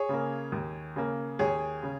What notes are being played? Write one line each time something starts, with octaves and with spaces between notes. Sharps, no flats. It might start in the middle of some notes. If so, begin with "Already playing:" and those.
Already playing: G#4 C#5
C#3 A#3
D#2
C#3 A#3
D#2 G#4 C#5
C#3